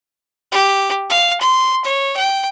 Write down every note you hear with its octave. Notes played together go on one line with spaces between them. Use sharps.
G4
F5
C6
C#5
G5